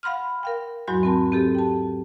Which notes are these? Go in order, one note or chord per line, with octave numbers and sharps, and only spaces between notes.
F5 F#5 B5 C6 F6
A#4 F5 G5
E2 G#2 F#3 F#4 B5 G6
C4 A#4 A5
C4 G4 A4
G5 A5